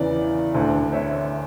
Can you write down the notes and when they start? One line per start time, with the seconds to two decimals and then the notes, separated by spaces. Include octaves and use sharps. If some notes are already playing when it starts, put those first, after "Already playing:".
Already playing: E2 C#3 E3 D5
0.54 D2 D3
0.93 C#5 E5